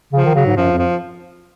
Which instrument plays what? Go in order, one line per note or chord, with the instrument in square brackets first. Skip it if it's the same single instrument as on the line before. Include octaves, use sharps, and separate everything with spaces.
[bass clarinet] C#3 [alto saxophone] F3
[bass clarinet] D#3
[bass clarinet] C#3 [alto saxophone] F#3
[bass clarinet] G#2
[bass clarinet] F#2 [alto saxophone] F3
[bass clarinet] F2
[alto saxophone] F3